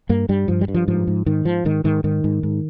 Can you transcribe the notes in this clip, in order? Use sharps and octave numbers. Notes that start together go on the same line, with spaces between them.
G2 A#3
G2 G3
G2 F3
G3
G2
F3
G#2 F3
G#2
G#2 D#3
G#2 F3
G#2 D#3
G#2 D#3
G#2 D#3
G#2
G#2